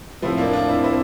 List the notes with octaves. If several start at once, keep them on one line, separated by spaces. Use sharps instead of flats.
A2 F3 C4 E4
A#3 D4
D4 F4
C4 E4
C4 E4